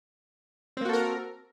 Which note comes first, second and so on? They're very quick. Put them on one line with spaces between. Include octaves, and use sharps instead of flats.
C4 A#3 F#4 A4 A#4